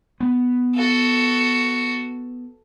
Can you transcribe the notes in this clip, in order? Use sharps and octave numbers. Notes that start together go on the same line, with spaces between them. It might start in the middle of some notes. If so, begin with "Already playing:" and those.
B3
F#4 A4